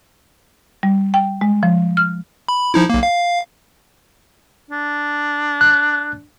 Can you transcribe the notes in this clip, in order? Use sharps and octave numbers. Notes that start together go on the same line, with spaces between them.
G3
G5
G#3
F3
F6
B5
F3 D#4 E4
B1 A#3
F5
D4
F#6